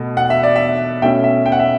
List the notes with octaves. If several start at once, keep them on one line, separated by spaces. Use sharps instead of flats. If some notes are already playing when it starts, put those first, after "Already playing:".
Already playing: B2 A3
F#5
E5
D5
E5
B2 A3 C#4 E5 G5
E5
G5
F#5
E5